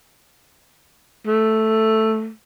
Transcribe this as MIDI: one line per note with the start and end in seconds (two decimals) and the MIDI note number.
1.27 2.31 57